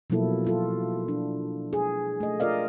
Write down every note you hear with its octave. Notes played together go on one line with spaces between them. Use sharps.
B2 F3 F#3 A#3 E4 A4
F#3 F4 A4
D4
G#4
A3 D#5
F4 A#4 D5 D#5 F5